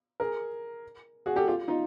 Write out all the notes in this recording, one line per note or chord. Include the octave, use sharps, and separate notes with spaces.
G#4 A#4
F#4 G#4
G4 A4
F4 G4
D#4 F4